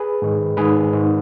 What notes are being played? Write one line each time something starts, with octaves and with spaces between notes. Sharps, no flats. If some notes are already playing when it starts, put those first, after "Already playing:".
Already playing: G#4 B4
G#2 D#3
G#2 D#3 G#4 B4
G#2 D#3